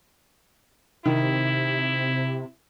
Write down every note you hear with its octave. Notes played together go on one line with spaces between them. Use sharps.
C3 D#3 E4